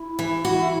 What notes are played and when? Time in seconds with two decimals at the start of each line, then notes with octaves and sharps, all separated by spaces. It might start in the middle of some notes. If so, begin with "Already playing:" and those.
Already playing: E4
0.19 E3
0.45 F#4